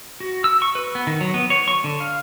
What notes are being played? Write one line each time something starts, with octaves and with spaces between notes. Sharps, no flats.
F#4
E6
C#6
B4
B3
D#3
F#3
B3
C#5
C#6
D3
F5